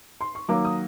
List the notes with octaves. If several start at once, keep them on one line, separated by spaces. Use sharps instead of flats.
C6
C#6
D#3 F#3 A#3 D6
D#6